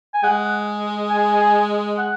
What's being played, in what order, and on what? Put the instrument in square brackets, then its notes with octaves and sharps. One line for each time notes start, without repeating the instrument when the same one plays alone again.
[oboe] G#5
[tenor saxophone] G#3 [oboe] F#5
[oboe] G#5
G#5
F#5